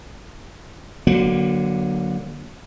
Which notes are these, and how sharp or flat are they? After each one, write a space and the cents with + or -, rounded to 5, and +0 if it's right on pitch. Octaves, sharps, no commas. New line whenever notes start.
D3 +0 F#3 +0 A#3 +35